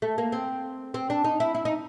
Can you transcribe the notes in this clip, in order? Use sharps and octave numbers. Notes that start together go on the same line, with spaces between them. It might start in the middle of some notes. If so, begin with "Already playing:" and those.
A3
A#3
C4
C4
D4
D#4
E4
E4
D#4